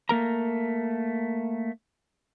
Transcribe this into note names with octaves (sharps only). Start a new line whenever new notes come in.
A3 A#3 A#4 A#5